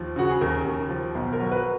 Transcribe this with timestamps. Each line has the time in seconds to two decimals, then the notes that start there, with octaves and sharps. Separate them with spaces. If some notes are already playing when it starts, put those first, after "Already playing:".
Already playing: D#2 F3
0.16 C#3 F#4
0.30 G#4
0.41 D#2 A#4
0.65 D#2
0.90 F3
1.15 B1
1.33 A#4
1.39 F#3
1.52 B4